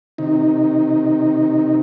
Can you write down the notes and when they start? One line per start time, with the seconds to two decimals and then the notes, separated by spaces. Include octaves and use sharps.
0.18 C3 D#3 D#4